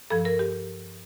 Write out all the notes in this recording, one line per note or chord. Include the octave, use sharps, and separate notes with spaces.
G2 F3 A4
A#4
G4